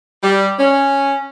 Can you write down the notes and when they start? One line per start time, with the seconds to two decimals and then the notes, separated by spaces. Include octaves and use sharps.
0.23 G3
0.59 C#4